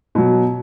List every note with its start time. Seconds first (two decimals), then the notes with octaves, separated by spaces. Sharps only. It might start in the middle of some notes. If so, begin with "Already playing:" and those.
0.15 B2 F#3